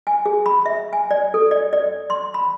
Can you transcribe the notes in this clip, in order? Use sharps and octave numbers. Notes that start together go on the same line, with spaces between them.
G#5
G#4
B5
E5
G#5
D5
A4
D5
D5
C6
B5